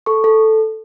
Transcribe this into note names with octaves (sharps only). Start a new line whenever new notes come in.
A4 C#6
A4